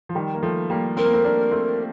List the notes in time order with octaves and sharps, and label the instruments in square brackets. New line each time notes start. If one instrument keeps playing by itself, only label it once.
[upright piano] F3
D#3 G3
A#3
F3 A3
G3 A#3
[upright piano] C4 [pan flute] A#4
[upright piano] A#3
A3 C4
A#3 D4
A3 C4